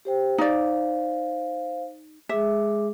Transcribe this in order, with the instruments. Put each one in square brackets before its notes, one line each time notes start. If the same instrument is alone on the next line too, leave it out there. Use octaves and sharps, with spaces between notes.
[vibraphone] G4 C5 G5
[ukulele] D#4 D5 [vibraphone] C5 F5
[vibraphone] G#3 G#4 D6 [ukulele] E5